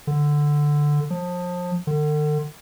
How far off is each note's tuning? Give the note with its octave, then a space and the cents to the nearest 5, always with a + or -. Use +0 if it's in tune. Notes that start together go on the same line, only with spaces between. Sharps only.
D3 +5
F3 +30
D3 +40